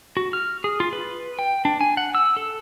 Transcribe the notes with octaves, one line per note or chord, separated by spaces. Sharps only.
F#4
F6
G#4
F4
B4
G5
D4
G#5
F#5
E6
A4